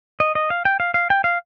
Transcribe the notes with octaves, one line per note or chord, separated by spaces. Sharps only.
D#5
D#5
F5
G5
F5
F5
G5
F5